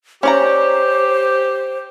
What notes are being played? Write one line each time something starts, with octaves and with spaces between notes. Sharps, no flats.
C#4 G4 C5 D5 A#5